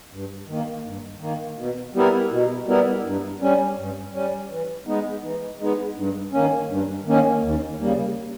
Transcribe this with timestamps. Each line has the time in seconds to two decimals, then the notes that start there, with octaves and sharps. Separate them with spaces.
0.12 G2
0.48 D#3 A#3
0.85 G2
1.21 D#3 A#3
1.58 B2
1.94 G3 B3 E4 A#4
2.31 B2
2.67 G3 B3 E4 A#4
3.04 G2
3.41 G3 C#4
3.77 G2
4.13 G3 C#4
4.50 E3
4.87 G#3 B3 D#4
5.23 E3
5.60 G#3 B3 D#4
5.97 G2
6.33 D#3 A#3 C#4
6.69 G2
7.06 D#3 A#3 C#4
7.43 D#2
7.79 C#3 G3 A#3